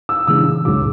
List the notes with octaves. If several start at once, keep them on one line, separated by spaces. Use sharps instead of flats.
E6
C#3 E3 G#3 D4 E6
C#2 C#3 F#3 D6